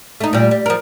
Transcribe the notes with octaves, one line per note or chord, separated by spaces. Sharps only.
A3 D#4
A#2 G3
G3
F3 A#4